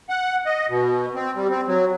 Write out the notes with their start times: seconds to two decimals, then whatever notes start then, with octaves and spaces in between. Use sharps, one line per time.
0.09 F#5
0.46 D#5
0.69 B2
1.15 C4
1.36 G3
1.49 C4
1.67 F#3